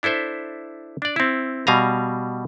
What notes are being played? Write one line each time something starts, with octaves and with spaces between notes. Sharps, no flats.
D4 E4 A4 C5 E5
D4 D5
C4 E4
B2 G3 F5 G#5 A#5